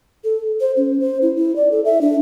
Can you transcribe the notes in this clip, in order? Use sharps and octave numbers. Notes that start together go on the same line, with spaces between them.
A4
C5
C#4
C5
E4
E4
D5
A4
E5
D4